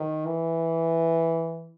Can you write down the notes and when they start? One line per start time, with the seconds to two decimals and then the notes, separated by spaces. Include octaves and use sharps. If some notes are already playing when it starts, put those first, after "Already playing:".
Already playing: D#3
0.26 E3